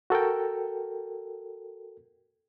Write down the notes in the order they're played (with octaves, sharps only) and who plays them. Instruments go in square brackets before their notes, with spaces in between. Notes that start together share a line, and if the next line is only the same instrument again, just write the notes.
[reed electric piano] F#4 A4 A#4 G5